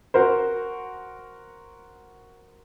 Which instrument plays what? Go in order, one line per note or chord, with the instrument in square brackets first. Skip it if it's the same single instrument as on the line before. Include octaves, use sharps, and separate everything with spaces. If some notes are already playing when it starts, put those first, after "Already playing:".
[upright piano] F#4 A#4 C5